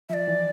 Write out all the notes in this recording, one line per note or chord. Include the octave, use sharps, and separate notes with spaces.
F3 D5 E5
E3